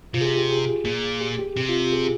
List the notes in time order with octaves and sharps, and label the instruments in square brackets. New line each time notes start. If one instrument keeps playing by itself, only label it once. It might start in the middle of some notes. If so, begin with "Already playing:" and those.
[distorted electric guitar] C3 [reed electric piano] F4
[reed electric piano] G#4
G4
G4
G#4
[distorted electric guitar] A#2
[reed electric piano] G4
G4
[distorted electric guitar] C3 [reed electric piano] G4
[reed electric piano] F4
G4
G#4